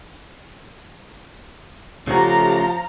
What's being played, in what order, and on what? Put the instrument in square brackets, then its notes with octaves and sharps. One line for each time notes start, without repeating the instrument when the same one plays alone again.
[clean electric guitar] C#3 C#4 F#4 [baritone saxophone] F3 [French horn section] A3 G4 [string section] F5 A#5